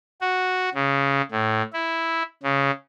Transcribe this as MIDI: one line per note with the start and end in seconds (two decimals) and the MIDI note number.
0.21 0.70 66
0.75 1.22 49
1.31 1.62 45
1.73 2.22 64
2.43 2.71 49